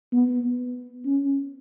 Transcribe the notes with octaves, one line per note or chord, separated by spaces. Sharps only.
B3
C#4